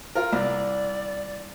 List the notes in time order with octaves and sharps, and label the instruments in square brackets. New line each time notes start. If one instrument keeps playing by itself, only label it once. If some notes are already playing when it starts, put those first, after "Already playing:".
[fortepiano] F4 A#4
[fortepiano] C2 [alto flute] D5